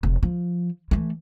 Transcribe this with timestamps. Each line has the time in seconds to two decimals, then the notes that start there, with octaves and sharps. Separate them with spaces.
0.03 F1
0.23 F3
0.91 E3 A3